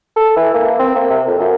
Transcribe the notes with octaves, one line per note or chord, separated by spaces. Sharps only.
A4
E3
A#3
C4
A#3
C3
F2
F#2